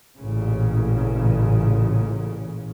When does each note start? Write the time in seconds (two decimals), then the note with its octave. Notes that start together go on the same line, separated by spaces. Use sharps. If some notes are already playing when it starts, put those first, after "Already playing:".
0.18 A1 A#2 C#3